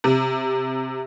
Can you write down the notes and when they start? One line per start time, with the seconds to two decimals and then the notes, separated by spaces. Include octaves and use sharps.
0.04 C3